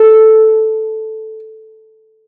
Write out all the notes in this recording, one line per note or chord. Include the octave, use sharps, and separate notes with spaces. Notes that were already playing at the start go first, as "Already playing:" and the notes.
Already playing: A4